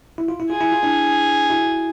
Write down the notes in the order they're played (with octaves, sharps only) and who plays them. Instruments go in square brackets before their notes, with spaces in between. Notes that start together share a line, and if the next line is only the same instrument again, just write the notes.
[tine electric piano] E4
F4
E4
[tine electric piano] F4 [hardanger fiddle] G#4
[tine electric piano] E4
F4
D4 E4
E4 F#4